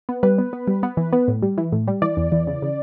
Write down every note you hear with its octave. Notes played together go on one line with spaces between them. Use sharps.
B3
G3 B4
B3
B3
G3
B3
E3
B3
A2
G3
E3
A2
G3
E3 D5
E2
E3
C#3
C#3